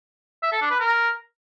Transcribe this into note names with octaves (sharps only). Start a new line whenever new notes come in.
E5
A4
D4
B4
A#4